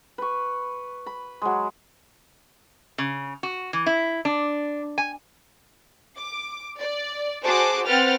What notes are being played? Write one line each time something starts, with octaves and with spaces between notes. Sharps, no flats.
B4 C#6
B5
F#3 G#3
C#3
F#4
E3
E4
D4
G#5
D6
D5
F#4 G#4 C5 A5 D6
C4 B4 F#5 G5 F6 A6